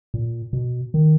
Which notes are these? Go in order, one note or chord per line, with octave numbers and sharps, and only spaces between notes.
A#2
B2
D#3